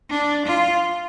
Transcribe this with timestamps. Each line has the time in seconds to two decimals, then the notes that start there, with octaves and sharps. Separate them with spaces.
0.10 D4
0.46 F4